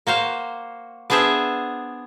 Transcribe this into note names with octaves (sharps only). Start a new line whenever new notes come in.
A#3 F#4 C5 F5
B3 D4 G#4 C5 E5